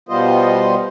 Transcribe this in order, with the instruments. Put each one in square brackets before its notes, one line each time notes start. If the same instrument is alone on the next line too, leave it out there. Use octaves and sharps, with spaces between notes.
[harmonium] B2 G3 B3 F4 C5 D#5